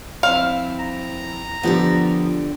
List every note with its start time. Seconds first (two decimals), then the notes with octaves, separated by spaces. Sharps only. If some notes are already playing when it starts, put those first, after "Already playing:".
0.23 F2 C4 E4 F5
0.79 A#5
1.63 D3 F3 B3 G4 D5